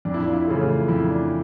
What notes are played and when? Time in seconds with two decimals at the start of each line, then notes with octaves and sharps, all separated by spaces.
0.05 F2 D4
0.14 E4
0.23 D4
0.29 F4
0.34 E4
0.47 C#3 E3 A3 E4
0.61 F4
0.88 F2 E4
1.09 D4